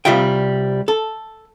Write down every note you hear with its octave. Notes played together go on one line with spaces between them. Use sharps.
C2 F2 G3 F4 E5 G5
A4